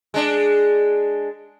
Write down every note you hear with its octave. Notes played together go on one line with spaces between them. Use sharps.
G#3 D4